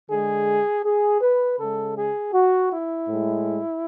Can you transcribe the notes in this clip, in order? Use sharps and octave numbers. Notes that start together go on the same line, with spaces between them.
D3 G#3 G#4
G#4
B4
C#3 G#3 A4
G#4
F#4
E4
A2
G#3